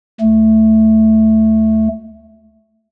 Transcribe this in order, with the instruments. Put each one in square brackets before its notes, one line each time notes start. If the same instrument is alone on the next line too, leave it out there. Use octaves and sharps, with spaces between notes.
[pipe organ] D2 A3